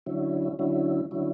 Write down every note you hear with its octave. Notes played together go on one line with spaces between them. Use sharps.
D3 F#3 C#4 E4
D3 F#3 C#4 E4
D3 F#3 C#4 E4